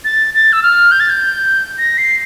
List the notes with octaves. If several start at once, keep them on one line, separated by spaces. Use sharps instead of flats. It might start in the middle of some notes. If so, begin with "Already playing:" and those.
A6
A6
E6
F6
G6
A6
G6
A#6
C7